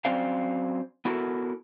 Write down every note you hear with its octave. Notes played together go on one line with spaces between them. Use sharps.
F#3 C4 C#4 C5 D5 F5
B3 E4 F#4 A4 A#4